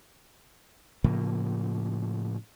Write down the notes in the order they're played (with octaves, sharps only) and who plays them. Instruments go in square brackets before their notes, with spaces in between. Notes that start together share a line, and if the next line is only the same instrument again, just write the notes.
[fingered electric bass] A2 C#3 F3 A#3